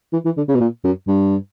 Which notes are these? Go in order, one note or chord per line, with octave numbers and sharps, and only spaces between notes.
E3
E3
D3
C#3
B2
A#2
F#2
G2